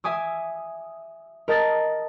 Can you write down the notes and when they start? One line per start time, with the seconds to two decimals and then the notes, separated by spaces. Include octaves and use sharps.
0.04 E5 G#5 D6 D#6
1.48 A#4 D#5 A5 D#6 A6 A#6